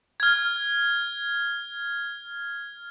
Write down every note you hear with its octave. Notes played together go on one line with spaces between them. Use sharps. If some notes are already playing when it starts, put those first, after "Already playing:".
F6 G#6